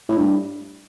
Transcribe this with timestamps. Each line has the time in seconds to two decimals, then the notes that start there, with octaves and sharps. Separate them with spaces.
0.09 A2
0.17 G2